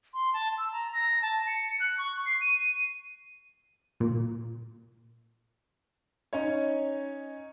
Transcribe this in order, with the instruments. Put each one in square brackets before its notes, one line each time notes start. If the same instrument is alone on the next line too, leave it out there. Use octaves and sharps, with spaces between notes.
[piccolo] C6
A5
E6
A#5
A#6
A5
C#7
F#6
C#6
C7
D#7
[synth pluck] A#2
[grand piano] C#4 D#4 C#5